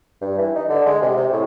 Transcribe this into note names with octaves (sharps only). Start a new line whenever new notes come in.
G2
E3
D#4
D3
G#3
C3
C3
A2